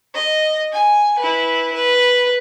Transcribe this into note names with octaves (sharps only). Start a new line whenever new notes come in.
D#5
G#5
E4 B4
B4